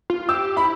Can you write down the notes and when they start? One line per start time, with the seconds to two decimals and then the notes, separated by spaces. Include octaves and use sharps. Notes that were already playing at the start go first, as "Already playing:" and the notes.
0.10 F4
0.29 G4 E6
0.56 E4 B5